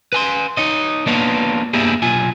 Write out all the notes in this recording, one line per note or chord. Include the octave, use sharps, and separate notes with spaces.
B4 G#5 C6
D#4 C#5 D#5
A#3 B3 D4 F4 B4 C#5
A#3 B3 D4 E4 G4 G#4
B1 F4 G#5